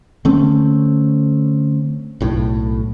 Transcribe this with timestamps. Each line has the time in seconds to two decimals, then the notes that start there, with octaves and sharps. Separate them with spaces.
0.25 D3 A3 C4 C#4
2.21 B1 A2